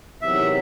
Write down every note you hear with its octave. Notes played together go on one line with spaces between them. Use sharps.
E2 C3 D#3 F#3 E5